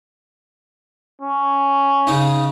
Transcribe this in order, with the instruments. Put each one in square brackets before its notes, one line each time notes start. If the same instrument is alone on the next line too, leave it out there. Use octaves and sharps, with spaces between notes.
[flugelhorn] C#4
[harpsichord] C#3 D#4